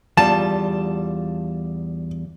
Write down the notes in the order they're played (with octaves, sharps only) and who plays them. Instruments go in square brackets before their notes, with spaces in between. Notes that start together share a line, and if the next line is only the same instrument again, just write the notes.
[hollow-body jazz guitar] E2 G3 F4 [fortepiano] A5